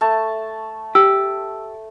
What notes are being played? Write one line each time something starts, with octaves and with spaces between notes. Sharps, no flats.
A3 A5
G4 E6